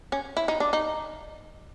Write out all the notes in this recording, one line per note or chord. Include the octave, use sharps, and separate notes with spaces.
C#4
E4
D#4
D4
D#4